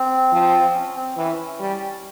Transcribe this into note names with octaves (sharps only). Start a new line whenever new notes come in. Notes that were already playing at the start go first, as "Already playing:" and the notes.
Already playing: C4
F3
C#4
C4
E3 C#4
G3